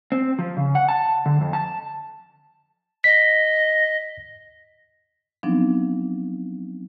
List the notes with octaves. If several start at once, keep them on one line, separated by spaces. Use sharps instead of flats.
C4
F3
C#3
F#5
A5
D3
F2
A5
D#5 B6
F3 F#3 B3 C4 D4 D#4